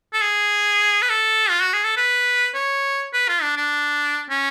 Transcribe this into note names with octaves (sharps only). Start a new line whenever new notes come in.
A4
G#4
B4
A4
F4
F#4
G#4
A4
B4
C#5
B4
F4
D4
D4
C#4